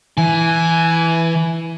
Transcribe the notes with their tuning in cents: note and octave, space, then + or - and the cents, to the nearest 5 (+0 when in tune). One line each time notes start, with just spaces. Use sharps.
E3 +0 G#5 +15